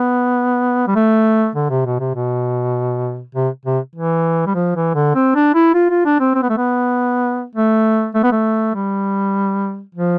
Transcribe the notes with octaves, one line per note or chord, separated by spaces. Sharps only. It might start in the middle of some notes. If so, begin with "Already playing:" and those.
Already playing: B3
G3
A3
D3
C3
B2
C3
B2
C3
C3
E3
G3
F3
E3
D3
C4
D4
E4
F4
F4
D4
C4
C4
B3
A3
B3
A3
A3
B3
A3
G3
F3